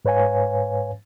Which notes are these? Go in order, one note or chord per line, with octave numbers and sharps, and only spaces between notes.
G#2 B4 C#5 F5 G#5